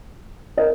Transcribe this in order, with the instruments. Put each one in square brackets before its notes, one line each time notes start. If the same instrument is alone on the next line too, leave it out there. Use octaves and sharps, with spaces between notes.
[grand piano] A#4 D#5